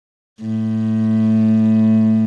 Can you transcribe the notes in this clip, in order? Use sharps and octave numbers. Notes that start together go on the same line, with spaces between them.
A2